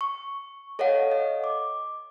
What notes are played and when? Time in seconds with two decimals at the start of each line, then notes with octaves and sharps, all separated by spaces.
0.01 C#6
0.79 A4 C#5 D#5 F5 F#5
1.11 D#5
1.44 D6